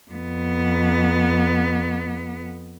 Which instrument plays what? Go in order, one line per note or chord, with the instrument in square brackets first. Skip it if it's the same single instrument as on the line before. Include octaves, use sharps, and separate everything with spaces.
[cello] F2 B3